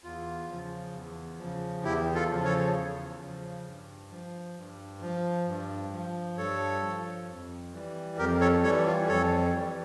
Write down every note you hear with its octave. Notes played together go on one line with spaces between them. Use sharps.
E2 F4
C#3 F3
E2
C#3 F3
E2 E4 G4
F4 A4
C#3 F3
A4 C#5
E2
C#3 F3
G2
F3
G2
F3
G2
F3
G2 A4 C#5
F3
F2
E3 G3
F2 G4 A#4
A4 C#5
E3 G3 A4 C#5
F4
F2 A4 C#5
E3 G3